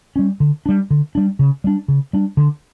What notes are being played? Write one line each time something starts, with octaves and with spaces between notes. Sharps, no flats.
G3 C#4
D3
G3 D4
D3
G3 D4
C#3
G3 D4
C#3
G3 D4
D3